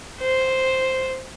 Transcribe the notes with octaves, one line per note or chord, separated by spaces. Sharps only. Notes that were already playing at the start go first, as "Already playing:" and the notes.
C5